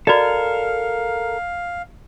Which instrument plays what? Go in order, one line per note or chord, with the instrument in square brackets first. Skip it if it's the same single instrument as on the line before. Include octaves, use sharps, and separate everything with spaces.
[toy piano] F#4 D5 D#5 [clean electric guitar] A4 A#4 [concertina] F5